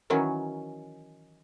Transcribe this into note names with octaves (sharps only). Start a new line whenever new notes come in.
D#3 E3 F#3 C#4